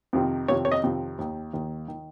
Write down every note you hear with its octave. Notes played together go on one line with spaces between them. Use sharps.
F2 C3 D#3
F2 C3 D#3 C#5
C#5
D#5
F2 C3 D#3
D#2 D#3
D#2 D#3
D#3